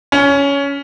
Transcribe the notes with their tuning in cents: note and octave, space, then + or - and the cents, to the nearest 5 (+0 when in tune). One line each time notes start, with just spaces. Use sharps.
C#4 +15